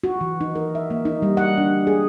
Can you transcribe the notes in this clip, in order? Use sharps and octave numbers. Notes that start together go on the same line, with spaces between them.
F#4
E3
D#4
A#4
E5
A#3
D#4
G3
F#5
D4
G#4